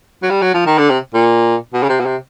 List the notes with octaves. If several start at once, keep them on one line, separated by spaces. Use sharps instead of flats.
F#3
G3
F#3
F3
D#3
D3
C3
A#2
B2
C#3
C3
B2
C3